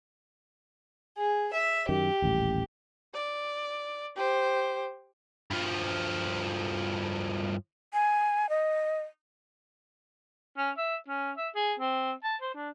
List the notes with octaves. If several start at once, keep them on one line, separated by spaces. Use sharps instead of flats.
G#4
E5
F#2 D#3 G4
D#1 A1
D5
G4 C5
G2 F3
G#5
D#5
C#4
E5
C#4
E5
G#4
C4
A5
C5
D4